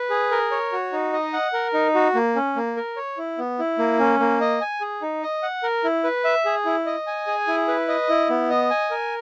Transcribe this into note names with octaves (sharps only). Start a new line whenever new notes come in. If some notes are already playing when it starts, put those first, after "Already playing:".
Already playing: B4
G#4
A#4
C#5
F#4
D#4
D#5
F#5
A#4
D#4
F#4
A#3
C#4
A#3
A#4
C#5
E4
B3
E4
A#3
C#4
A#3
D#5
G#5
G#4
D#4
D#5
F#5
A#4
E4
B4
E5
G#4
E4
D#5
G#5
G#4
E4
B4
D#5
E4
B3
D#5
G#5
A#4